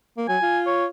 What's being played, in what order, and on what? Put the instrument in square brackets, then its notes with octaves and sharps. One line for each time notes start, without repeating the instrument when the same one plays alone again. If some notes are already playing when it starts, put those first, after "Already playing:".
[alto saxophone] A#3
[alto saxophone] F#3 [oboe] G#5
[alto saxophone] F4
[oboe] C#5